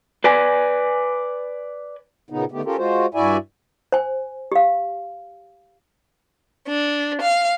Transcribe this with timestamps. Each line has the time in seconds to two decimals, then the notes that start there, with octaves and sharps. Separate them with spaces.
0.24 B4 D5 G#5
2.30 A#2 C#3 B3 D#4
2.52 D3 D#3 A3 B3 G4
2.65 C#4 F4 G4 A4 A#4
2.77 G#3 F4 F#4 C5
3.14 G2 E4 F#4 D5 E5 G#5
3.92 C5 G#5
4.52 G4 F5
6.68 D4
7.22 F5